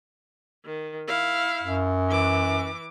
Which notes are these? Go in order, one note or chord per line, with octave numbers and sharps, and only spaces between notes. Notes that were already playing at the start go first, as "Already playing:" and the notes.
D#3
E4 F5
F#2
E3 D6